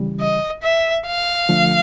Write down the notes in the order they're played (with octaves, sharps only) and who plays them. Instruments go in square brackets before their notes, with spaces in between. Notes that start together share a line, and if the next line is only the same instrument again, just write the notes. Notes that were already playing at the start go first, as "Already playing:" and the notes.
Already playing: [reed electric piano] C#3 E3 G3
[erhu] D#5
E5
F5
[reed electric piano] D3 F3 A3